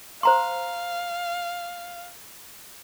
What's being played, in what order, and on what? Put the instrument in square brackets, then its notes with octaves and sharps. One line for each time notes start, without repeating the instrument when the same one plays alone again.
[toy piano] C5 A#5 C6 [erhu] F5